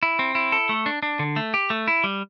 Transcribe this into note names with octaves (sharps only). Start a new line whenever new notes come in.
E4
C4
E4
A4
A3
D4
D4
D3
A3
G4
A3
E4
G3